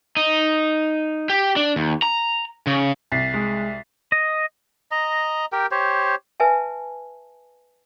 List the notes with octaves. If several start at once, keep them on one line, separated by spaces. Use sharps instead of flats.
D#4
G4
D4
D#2
A#5
C#3
C2 A6 B6 C7
G#3
D#5
D#5 A#5
G4 A#4 G5
G4 C5 C#5
B4 E5 G#5 A5